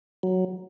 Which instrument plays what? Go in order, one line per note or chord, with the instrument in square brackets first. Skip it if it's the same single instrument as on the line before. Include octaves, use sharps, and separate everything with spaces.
[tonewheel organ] F#3